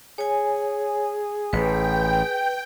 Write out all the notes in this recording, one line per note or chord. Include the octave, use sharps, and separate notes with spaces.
G#4 C#5 G#5
A1 B4 G5